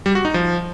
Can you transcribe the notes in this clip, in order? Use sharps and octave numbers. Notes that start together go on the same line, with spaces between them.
G3
F#4
D#4
F3